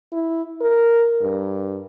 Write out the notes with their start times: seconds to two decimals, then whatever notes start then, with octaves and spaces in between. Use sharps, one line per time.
0.12 E4
0.61 A#4
1.21 G2